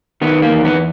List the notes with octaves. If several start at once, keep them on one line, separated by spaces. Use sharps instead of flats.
D#3 B3
A#3
E2
B3